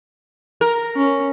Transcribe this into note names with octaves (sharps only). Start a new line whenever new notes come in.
A#4
C#4